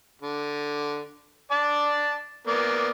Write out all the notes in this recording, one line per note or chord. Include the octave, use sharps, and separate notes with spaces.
D3
D5 A5
A#3 B3 D5